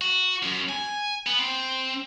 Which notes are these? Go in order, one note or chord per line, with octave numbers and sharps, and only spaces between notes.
F#4
F#2
G#5
B3
C4